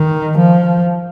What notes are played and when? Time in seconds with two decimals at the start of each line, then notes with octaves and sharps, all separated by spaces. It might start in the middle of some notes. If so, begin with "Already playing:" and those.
Already playing: D#3
0.37 F3